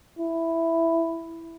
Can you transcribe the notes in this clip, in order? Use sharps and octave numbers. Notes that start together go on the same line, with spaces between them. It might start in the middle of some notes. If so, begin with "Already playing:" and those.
E4